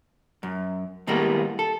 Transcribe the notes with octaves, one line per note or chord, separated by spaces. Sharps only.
F#2
D#2 A2 G3 G#3 A#3 B3
A4